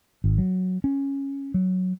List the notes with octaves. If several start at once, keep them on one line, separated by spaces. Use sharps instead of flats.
G#1
F#3
C#4
F#3